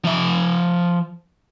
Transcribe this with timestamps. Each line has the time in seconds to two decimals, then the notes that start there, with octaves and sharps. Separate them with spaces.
0.05 F3 E5